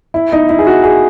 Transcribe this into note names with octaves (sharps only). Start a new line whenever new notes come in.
E4
D#4
E4
G#4
F#4
G#4